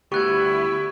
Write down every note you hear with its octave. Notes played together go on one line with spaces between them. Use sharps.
D2 G3 B3 E4 G4 C#6 F#6 G#6